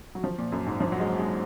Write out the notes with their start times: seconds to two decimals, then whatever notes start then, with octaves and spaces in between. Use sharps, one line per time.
0.15 F#3
0.24 F3
0.38 A#2
0.52 F#2
0.66 G#2
0.80 F3
0.92 F#3
1.00 G#3
1.19 G#3